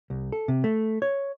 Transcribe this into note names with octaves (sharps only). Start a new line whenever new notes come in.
C2
A4
C3
A3
C#5